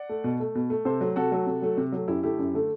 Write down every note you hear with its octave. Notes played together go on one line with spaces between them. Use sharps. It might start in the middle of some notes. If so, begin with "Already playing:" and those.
Already playing: D5 F#5
A3
B2
A3
B2
A3
C3 A4 C5
F#3 A3
C3 F#4 A4
F#3 A3
C3
F#3 A3
C3
F#3 A3
F#2 E4 G4
D3 A3 E4 G4
F#2
D3 A3